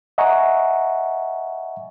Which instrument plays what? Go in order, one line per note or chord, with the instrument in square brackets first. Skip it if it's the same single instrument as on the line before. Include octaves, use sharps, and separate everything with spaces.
[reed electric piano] D#5 E5 F#5 G#5 A#5 C#6